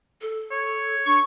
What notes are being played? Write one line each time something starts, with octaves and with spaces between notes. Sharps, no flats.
A4
C#5
D4 C#6